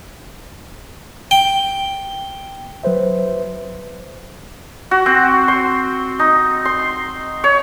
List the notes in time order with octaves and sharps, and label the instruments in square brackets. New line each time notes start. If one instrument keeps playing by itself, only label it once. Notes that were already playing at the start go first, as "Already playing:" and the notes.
[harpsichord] G5
[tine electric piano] F#3 B4 C5 E5
[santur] F#4
C4
C6
D#4
C6
C#5